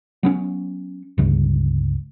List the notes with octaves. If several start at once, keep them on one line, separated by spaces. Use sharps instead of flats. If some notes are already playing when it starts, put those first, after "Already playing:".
F#3 B3 C#4
G1 C#2